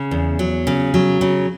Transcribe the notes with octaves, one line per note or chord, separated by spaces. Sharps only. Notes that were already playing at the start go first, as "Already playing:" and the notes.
Already playing: C#3
E2
F#3
C#3
F#3
C#3